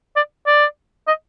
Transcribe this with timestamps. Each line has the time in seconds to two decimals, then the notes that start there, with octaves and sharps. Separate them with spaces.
0.16 D5
0.47 D5
1.08 D#5